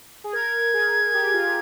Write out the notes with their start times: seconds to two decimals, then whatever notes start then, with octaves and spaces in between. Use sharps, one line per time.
0.24 G#4
0.33 A#4 G#6
0.74 G#4
1.14 G4
1.34 F4